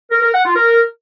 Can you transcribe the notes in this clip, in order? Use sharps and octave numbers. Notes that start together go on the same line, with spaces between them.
A#4
A#4
F#5
F4
A#4